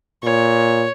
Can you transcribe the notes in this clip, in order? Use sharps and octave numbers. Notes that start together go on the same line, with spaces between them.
A#2 C#5